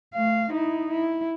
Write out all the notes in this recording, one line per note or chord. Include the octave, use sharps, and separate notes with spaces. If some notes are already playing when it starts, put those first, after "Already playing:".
A3 F5
D#4 E4
E4